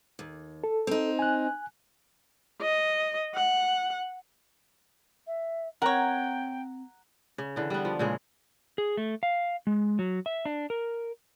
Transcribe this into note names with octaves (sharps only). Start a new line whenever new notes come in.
D#2
A4
C4 D#4
G#5 F#6
D#5
F#5
E5
C4 A#4 C#5 F#5 G5 A#5 G#6
C#3
D3 E3
G3 B3
F3
A#2 C#3 G#3
G#4
A3
F5
G#3
F#3
E5
D4
A#4